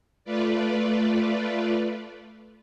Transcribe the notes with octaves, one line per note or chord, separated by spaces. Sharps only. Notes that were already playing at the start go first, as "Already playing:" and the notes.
A3 F4 B4 D5